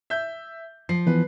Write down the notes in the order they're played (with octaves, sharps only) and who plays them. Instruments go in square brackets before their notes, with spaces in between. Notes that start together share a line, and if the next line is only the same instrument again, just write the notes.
[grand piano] E5 G6
[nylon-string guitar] F3 [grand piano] C7
[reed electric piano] E3 B3 [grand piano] B4